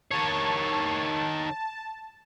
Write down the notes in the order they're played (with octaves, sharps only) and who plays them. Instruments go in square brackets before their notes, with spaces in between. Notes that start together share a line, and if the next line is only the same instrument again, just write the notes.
[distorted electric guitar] D#3 C#5 [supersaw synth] A5